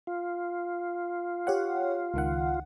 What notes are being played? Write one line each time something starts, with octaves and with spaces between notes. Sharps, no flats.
F4
G4 C#5 F#5
C#2 D#3 F#5